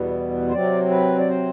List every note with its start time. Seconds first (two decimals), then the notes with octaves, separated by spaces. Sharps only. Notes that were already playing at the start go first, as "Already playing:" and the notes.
Already playing: E2 B2 G3 B3
0.49 C5
0.52 C3 F#3 C4 D5
0.90 B4
1.19 D5
1.28 C5